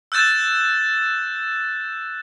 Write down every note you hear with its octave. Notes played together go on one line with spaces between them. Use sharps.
E6 F#6 G6 A6 E7